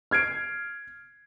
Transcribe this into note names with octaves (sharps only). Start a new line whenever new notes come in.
F6 G#6 C7 D7